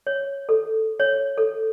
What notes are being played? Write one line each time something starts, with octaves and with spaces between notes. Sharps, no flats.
C#5
A4
C#5
A4